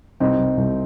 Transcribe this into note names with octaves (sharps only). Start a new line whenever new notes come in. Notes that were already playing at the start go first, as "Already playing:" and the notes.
C2 C4 D#4
C2
C2